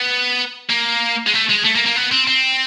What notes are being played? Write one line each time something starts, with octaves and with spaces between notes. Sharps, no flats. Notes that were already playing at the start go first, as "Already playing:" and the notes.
Already playing: B3
A#3
G#3
A3
G#3
A3
A#3
A#3
B3
C4
C4